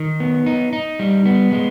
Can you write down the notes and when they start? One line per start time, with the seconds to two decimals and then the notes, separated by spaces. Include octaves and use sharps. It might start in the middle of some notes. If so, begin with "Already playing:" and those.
Already playing: D#3
0.20 B3
0.46 D#4
0.73 D#4
0.99 G3
1.26 B3
1.52 G#3